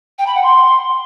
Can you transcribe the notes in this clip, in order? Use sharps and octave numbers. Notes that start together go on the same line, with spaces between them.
G5
B5
F#5
C6